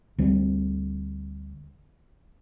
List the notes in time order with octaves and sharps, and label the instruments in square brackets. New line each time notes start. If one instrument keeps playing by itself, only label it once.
[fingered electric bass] D2 G3 C4